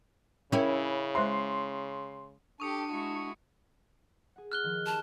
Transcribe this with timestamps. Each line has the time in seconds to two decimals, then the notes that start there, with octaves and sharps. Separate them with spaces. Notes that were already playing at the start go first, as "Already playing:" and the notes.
0.52 C#3 C#4 E4 A#4 E5 G5
1.15 G#3 C5 E5 C6
2.60 D4 G4 A4 C#6 D#6 C#7
2.91 G#3 E4 F#4
4.36 G#4 F#5
4.52 F6 F#6 G7
4.63 D#3 F3 C4
4.86 C#4 G4 A5